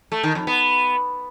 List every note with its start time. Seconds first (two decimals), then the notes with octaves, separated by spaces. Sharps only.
0.12 A3
0.23 D#3
0.35 F2
0.47 B3